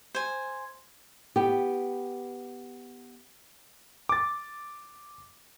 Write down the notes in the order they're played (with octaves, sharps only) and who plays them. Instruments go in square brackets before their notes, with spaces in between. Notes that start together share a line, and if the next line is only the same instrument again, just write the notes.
[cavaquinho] C5 G#5
[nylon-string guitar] B3 G4
[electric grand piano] D6 A6